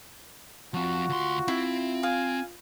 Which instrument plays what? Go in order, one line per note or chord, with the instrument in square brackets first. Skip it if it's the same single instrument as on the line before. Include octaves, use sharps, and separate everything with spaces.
[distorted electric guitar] F3 C4 [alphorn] F4 [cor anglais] F#4
[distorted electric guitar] D2 C6
[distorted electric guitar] C4 [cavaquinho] E4
[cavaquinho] F5 [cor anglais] G#5